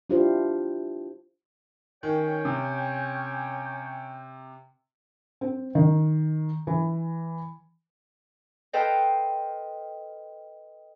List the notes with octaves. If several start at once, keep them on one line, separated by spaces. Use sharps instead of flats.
D4 E4 F4 G4 C5
D#3 C#4 C#5 G5
C3
C4
D#3
E3
A4 B4 C5 D#5 F5 G5